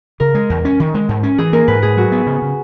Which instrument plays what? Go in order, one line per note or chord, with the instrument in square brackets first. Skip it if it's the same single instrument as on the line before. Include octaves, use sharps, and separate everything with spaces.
[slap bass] C#3 [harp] A#4
[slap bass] G#3
E2
C#4
D#3
G#3
G#2
C#4
[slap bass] E3 [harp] G#4
[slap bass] A#3 [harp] A#4
[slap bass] G#2 [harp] B4
[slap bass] G#2 [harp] G#4
[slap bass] F#3 [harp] F#4
[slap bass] B3
C#3
C#3